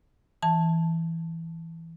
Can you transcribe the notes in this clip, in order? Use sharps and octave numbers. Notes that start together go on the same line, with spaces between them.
E3 A5